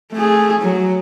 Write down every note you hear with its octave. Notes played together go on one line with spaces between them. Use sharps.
A3 G#4
F#3